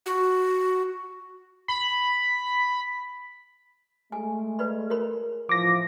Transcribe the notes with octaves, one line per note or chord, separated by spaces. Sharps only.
F#4
B5
G#3 A3 G#5
B4 D5 B5
A#4 C#5 B5
A2 E3 F3 D6 A#6